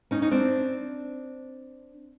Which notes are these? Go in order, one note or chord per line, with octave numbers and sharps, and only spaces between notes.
C#4 D#4
D#4
C4 D4